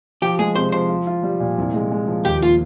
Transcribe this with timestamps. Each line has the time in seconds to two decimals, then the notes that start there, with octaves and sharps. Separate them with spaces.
0.22 F3 G4
0.39 G#3 G#4
0.55 C3 C5
0.72 F3 C5
0.89 F4
1.07 F4
1.23 G3
1.40 A#2
1.58 C2
1.74 G#3
1.91 G#3
2.08 F3
2.25 D#2 G4
2.42 A#3 F4